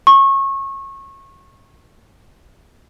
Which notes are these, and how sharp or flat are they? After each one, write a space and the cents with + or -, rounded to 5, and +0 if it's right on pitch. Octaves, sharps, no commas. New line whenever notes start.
C#6 -25